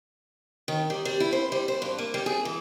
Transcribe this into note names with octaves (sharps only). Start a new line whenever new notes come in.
D#3
G3
G3
E4
C5
G3
C5
G2
A#3
G3
G#4
E3